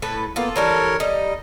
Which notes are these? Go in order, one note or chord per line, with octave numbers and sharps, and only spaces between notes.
A2 A4 B4
A#3 B3 F4 A4
E3 G3 A4 A#4 C#5
G3 D#4 D#5